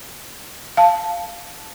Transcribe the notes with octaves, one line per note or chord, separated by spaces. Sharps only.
F5 A5